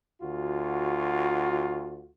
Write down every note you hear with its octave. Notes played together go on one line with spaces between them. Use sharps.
D2 F4 F#4